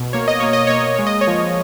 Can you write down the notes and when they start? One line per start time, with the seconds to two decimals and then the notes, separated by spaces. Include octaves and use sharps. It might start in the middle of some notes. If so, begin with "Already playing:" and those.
Already playing: B2
0.13 A#3 C#5
0.28 D#5
0.40 A#3 C#5
0.53 D#5
0.67 A#3 C#5
0.80 D#5
0.94 G#3 C#5
1.07 D#5
1.21 C#5
1.27 F3